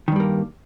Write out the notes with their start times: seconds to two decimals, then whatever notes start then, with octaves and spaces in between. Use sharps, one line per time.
0.08 D#3
0.12 G2
0.16 G3
0.20 A#3